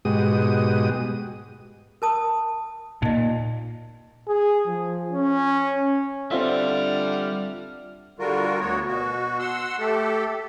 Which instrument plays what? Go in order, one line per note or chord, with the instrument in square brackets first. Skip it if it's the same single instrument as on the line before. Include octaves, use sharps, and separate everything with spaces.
[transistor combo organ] G#2 B2 G#3 F#4 G4 D#6
[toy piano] A#4 A5 D#6
[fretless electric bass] A#2 [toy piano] D#4 D#5
[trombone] G#4
F3
C#4
[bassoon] D3 [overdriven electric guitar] G3 [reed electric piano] C4 F4 E5 [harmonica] D4 F#5 F6
[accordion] D3 G3 F4 F#4 A#4
D2 B3 F#4 C#5
B2 F#4
F#5 C6 E6
A3 G4 A4